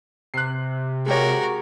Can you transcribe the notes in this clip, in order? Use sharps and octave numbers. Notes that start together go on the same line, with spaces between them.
C3 F#6 C7
G#3 F#4 G4 A#4 C#5